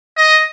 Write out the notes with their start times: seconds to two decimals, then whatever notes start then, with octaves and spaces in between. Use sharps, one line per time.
0.17 D#5